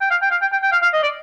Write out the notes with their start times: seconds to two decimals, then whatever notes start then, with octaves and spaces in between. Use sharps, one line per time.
0.01 G5
0.10 F5
0.22 G5
0.31 F5
0.41 G5
0.52 G5
0.62 G5
0.72 F5
0.82 F5
0.93 D#5
1.03 D5